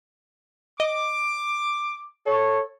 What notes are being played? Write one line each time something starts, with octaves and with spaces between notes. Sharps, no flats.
D#5 D6
A4 C#5